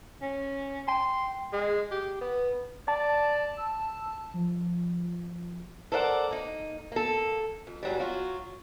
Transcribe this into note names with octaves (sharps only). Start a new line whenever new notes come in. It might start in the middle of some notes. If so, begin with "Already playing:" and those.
C#4
G5 C6
G#3
G4
B3
D5 A5
E6
F3
A4 A#4 C5 D5 E5 F#5
A#3 D#4
A#3 A4
F2
G#2 F#3 G3
F#3 F4 F#4